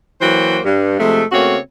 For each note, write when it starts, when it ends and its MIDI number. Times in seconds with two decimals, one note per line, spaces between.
0.21 0.59 52
0.21 0.59 54
0.21 0.59 58
0.21 0.59 66
0.21 0.59 72
0.21 0.59 79
0.64 0.94 43
0.98 1.22 48
0.98 1.22 53
0.98 1.22 56
0.98 1.22 57
1.32 1.57 49
1.32 1.57 57
1.32 1.57 58
1.32 1.57 60
1.32 1.57 66
1.32 1.57 73